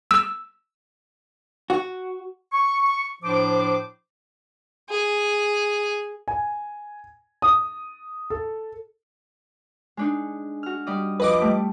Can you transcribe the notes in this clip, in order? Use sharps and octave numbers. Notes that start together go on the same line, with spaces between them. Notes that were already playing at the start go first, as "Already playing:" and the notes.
E6
F#4
C#6
A2 F3 D4 C5 D6
G#4
G#5
D#6
A4
G#3 D4 D#4
F#4 F6
G3 D5 D#5
F2 F3 B4 D#5 D6
G3 A3